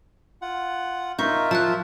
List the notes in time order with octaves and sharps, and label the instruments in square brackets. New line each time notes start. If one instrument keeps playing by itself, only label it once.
[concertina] F4 F#5
[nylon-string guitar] D#4 [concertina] F4 A#4 E5 [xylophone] C#6 G6
[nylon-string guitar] F3 [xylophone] A5 F6 F#6